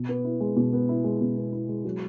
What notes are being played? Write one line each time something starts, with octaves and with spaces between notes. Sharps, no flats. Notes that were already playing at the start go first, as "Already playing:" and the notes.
Already playing: B2
B3
E4
G#3
B2
B3
E4
G#3
B2
B3
E4
G#3
F#3